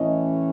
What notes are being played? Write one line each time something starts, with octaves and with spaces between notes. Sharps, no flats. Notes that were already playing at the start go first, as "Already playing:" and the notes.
Already playing: A2 E3 A3 C#4 D#5